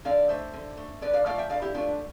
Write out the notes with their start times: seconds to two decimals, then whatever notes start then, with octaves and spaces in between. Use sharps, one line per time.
0.05 D3 D5 F5
0.29 A3 C5 E5
0.54 D3
0.77 A3
1.02 D3 B4 D5
1.14 D5 F5
1.26 F3 A3 D5 F5
1.38 E5 G5
1.50 D3 D5 F5
1.62 E4 G4
1.74 F3 A3 D4 F4